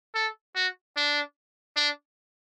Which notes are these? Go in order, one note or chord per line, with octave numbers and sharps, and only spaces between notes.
A4
F#4
D4
D4